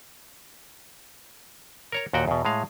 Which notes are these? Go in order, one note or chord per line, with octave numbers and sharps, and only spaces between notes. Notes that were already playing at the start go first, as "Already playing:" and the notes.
A#4 C#5 A#5
D#2 A#2 F#4 F#5 G5
E2 B2
A2 G#3 F5